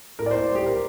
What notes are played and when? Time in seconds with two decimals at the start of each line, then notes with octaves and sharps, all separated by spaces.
0.19 A2 A#4
0.26 D5
0.31 C5
0.34 A#3
0.51 G3 G4
0.66 A#4